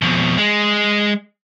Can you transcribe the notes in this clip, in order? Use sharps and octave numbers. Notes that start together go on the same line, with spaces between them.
F2 B2
G#3